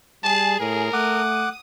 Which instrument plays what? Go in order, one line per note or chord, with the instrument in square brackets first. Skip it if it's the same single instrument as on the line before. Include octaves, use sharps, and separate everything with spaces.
[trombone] G3 [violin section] G#4 [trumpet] A5
[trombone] A2 [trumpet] A#4
[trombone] A3 [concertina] F#5 D6 [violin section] D#6